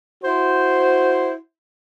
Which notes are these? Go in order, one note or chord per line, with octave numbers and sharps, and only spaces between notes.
E4 F#4 C5